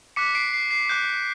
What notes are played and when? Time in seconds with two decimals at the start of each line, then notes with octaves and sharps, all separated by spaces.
0.16 D6 F#6 B6 C#7
0.35 C7 D7
0.53 C7
0.71 C7
0.89 D6 F#6 G6